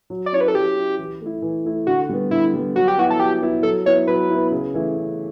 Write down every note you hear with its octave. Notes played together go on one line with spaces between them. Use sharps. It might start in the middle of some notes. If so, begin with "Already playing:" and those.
F#3
D5
C#4 E4 C#5
B4
A4
F#3 G4
C#4 E4
E3
A3
E4
E3
A3 E4
D3 F#4
G3 B3
D3 E4
G3 B3
F#3 F#4
G4
B3 E4 F#4
A4
F#3 G4
B3 E4
F#3 A4
B3 E4 C#5
F#3 B4
B3 E4
C#3
E3 A3 E4
C#3